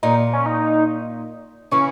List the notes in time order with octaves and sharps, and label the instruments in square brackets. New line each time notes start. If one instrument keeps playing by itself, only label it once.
[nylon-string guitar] A#2 [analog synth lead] D#4
[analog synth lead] C#4
D#4
[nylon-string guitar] C#3 E3 [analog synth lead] C#4